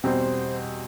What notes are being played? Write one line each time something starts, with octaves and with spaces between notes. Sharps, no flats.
E2 B2 G3 C4 C5